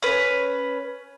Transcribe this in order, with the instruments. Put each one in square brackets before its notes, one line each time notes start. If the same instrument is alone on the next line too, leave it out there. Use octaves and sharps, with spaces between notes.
[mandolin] C#4 B4